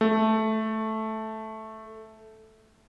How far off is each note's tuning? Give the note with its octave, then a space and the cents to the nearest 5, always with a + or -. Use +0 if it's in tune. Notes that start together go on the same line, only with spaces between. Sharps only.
A3 -5